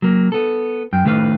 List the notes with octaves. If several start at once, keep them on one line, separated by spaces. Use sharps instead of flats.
F#3 A#3
B3 A4
F#2 G5
A2 D#3 A3 B4 F5